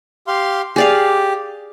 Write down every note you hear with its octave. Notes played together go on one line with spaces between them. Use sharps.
G4 F5 C6
G4 G#4 D5 F5